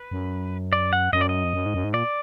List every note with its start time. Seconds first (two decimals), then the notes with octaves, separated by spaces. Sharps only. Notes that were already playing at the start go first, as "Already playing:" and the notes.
Already playing: B4
0.11 F#2
0.73 D5
0.93 F#5
1.13 F#2 D#5
1.21 D5
1.29 D#5
1.44 F2
1.53 F#2
1.66 G#2
1.74 F#2
1.84 G#2
1.94 A#2 D5